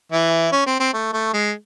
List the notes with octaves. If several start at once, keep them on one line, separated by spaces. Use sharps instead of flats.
E3 E4
C#4
C4
C4
A3
A3
G#3